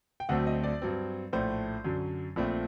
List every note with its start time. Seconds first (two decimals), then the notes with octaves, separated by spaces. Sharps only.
0.20 G5
0.29 D2 D3 F#3 A3 C4 F#5
0.47 D#5
0.64 D5
0.82 G2 F#3 C4
1.33 A#1 A2 A3 C5
1.85 F#2 D3 F#3
2.36 A#1 A#2 A3 C4